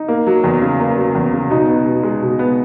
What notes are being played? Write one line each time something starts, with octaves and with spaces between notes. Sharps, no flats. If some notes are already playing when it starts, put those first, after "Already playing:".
Already playing: D#4
A#3
F#3
E2
C#3
A#3
F#3
E2
C#3
B2 D#4
B3
B2
G#3
B2
B3